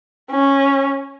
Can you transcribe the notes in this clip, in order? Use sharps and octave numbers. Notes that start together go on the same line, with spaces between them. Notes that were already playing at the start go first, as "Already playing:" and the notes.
C#4